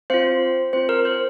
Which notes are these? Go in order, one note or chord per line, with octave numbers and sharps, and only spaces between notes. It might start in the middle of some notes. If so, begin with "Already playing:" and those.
C4 F4 C5 F5
C4 F4 C5
A#4
C5